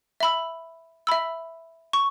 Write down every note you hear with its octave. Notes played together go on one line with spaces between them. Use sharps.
E5 B5 E6
E5 B5 E6
C#6